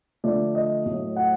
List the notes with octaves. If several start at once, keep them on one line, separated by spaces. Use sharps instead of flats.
D3 F3 A3 D5
D#5
A2 F#3 A3
F#5